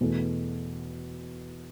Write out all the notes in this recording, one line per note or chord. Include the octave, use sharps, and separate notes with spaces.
E2 B2 A3